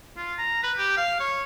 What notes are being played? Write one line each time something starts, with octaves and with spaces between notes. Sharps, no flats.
F4
A#5
B4
G4
F5
C#5